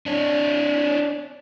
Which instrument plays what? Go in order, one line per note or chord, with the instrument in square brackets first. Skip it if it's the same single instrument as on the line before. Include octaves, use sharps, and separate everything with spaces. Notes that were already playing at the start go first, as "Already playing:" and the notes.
[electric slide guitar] D4 C#5